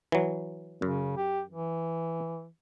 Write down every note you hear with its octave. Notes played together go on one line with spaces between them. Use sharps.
E3 F#3
F#2 C#3
G4
E3